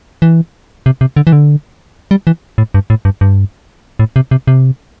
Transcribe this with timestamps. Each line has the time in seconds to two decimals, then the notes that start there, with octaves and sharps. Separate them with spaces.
0.22 E3
0.86 C3
1.01 C3
1.16 D3
1.27 E3
1.32 D3
2.11 G3
2.27 E3
2.58 A2
2.74 G2
2.90 A2
3.05 G2
3.21 G2
3.99 A2
4.16 C3
4.31 C3
4.47 C3